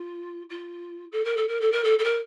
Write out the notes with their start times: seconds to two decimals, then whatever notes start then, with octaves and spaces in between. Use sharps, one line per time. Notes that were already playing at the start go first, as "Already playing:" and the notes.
Already playing: F4
0.49 F4
1.12 A4
1.24 A#4
1.36 A4
1.48 A#4
1.60 A4
1.72 A#4
1.84 A4
1.98 A4
2.04 A#4